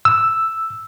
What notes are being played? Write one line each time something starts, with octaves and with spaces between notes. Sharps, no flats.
E6